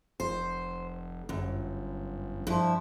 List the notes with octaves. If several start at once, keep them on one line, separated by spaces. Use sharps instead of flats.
F1 C5
G1 F#2
G2 F3 E4